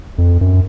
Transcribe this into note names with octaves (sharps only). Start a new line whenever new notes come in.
F2
F#2